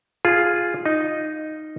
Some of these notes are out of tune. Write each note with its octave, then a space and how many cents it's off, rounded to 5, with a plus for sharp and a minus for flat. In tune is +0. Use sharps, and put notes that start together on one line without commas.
F4 +0 G#4 +0
D#4 +0 D#5 -10